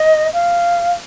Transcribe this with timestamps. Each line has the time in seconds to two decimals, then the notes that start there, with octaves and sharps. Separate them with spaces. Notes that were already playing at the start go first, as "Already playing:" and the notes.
Already playing: D#5
0.33 F5